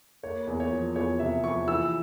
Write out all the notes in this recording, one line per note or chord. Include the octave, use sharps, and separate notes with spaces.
A#3 C#5
E2
C#5
F3
E2 C#5
C3 E5
F3 C#6
E3 E6